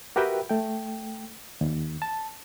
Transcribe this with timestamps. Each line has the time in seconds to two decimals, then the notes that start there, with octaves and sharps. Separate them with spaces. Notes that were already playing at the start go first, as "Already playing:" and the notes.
0.16 F#4 G4 A#4 B4 E5 G5
0.49 A3 G5
1.61 D#2
2.02 A5